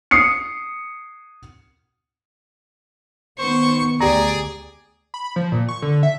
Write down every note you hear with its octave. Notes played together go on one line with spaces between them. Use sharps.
D#6 C7 C#7
D#3 B3 C5 C#6
D2 G4 G#4 D5 A#5
B5
F3
A#2
C#6
D3
E5